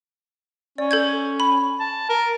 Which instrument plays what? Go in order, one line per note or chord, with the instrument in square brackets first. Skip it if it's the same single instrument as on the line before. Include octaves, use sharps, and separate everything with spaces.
[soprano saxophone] C#4 [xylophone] D5
[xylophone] A4 G6 G#6
B5
[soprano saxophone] A5
A#4